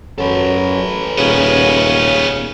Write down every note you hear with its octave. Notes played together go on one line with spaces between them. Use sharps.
F#2 F#3 A4 B4
D#1 C#3 B3 C#4